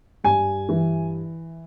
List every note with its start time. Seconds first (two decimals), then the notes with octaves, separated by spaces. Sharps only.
0.24 G2 G#5
0.69 E3